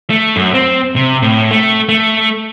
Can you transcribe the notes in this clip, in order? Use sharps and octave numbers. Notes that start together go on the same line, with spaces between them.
A3
F#2
C4
C3
A2
A3
A3